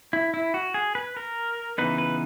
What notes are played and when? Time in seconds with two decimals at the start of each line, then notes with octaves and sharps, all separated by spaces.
0.13 E4
0.34 E4
0.54 F#4
0.74 G#4
0.95 B4
1.17 A#4
1.78 C#3 E3 B3 D#4 B4
1.98 B4